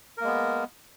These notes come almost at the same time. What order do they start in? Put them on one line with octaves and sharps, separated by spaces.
A#4 A#3 G#3 B3